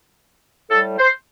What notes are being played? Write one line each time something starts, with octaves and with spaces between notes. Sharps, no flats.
A2 G3 A4
C5